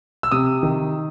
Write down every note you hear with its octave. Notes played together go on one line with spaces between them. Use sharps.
E6
C3 D#6
D#3